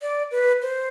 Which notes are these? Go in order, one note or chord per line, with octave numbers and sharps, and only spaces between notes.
D5
B4
C5